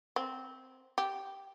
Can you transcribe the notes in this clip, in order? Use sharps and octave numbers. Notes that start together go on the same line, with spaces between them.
C4
G4